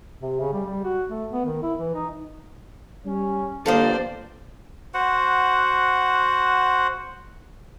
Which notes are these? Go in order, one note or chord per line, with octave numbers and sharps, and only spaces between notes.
C3
C#3
G3
G3
F#4
A3
B3
D#3
E4
E3
D#4
G3 C#4
G1 F2 A#3 A4 C5 D5 F5 D#6
F#4 C5 F#5